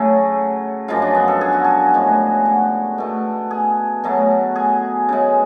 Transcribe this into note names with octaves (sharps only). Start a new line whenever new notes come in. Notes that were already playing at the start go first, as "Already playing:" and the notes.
Already playing: C#3 F#3 A3
F#2 F3 G#3 F4
D4
B3
A4
G#4
F#4
G#4
A2 G#3
F#4
B2 A3
G#4
B2 F#3 A3
G#4
C#3 G#3